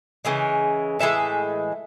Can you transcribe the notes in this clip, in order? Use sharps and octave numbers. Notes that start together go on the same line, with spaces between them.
C#3 E3 G#3
A2 E3 G#3 E5